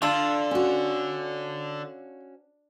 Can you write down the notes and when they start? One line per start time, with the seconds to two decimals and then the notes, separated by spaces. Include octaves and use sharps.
0.02 D3 D4 F4 A4
0.51 C#4 F#4